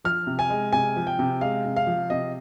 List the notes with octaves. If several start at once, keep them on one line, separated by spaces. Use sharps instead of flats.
F3 F6
C3
G#5
G#3
C3 G#5
F3
G5
C3
G#3 F5
C3
F5
F3
C3 D#5